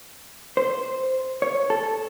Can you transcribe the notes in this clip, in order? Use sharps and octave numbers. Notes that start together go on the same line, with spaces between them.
C5
C#5
A4